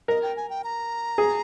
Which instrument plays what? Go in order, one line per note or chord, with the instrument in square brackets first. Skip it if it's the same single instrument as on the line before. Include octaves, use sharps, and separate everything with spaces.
[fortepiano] A#4 [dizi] D#5
[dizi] G5
G#5
G5
A#5
[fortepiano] G#4